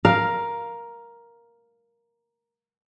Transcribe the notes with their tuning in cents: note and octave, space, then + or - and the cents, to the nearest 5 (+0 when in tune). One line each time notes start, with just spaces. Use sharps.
A#4 +10 F5 +0